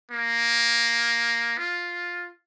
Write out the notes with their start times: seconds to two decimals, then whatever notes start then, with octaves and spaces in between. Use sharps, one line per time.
0.11 A#3
1.58 F4